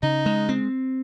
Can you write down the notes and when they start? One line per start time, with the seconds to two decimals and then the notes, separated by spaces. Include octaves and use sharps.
0.03 C#3 D#4
0.26 G#3
0.49 C4